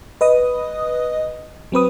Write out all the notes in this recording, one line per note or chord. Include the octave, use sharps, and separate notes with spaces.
B4 D#5 D#6
F#3 C4 B4 D#6